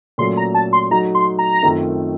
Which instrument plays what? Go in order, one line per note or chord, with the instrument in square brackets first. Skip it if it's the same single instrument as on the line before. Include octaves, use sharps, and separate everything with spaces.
[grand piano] A#2 F#3 A3 C#4 A4 [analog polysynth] C6
[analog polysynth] A#5
A5
C6
[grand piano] F#3 A3 D#4 F#4 [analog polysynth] A#5
[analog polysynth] C6
A#5
[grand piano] F#2 D#3 A3 C4 F4